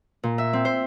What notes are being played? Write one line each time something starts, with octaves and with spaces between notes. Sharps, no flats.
A#2
E5
C4
C5